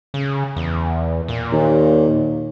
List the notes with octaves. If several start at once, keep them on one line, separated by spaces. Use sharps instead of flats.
C#3
E2
A#2
D#2